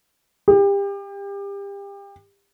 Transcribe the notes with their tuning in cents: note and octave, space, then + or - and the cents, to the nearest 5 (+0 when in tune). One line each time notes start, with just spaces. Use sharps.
G4 +30